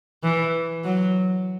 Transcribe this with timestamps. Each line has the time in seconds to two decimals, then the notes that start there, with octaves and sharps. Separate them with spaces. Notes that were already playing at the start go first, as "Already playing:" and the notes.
0.23 E3
0.84 F#3